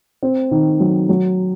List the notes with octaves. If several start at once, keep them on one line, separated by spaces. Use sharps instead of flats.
C4
D#3
F#3
F#3